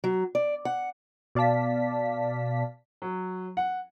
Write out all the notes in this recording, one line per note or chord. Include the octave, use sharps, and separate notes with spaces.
F#3
D5
F#5
B2 D5 F5 A5 B6
F#3
F#5